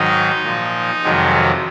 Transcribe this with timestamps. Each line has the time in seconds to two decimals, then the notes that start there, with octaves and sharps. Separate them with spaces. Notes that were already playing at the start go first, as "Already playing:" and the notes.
Already playing: G#2 D#3 F#3 D#4
0.43 A#2 F3
1.03 F2 C3 D#3 F#3 G#3